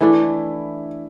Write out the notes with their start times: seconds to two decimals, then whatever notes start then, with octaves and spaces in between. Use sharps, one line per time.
0.01 E3 A3 D4 E4